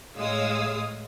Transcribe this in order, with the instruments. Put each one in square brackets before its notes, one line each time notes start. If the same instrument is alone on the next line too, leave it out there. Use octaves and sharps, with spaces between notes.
[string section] A2 G#3 C#5 F5 D#6 E6